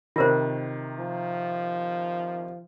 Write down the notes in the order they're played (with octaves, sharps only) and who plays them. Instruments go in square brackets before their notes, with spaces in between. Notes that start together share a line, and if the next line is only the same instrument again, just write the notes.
[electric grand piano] C3 D#3 [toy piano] F4 A#4 C5
[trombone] F3